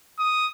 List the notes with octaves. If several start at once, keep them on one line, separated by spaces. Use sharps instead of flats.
D#6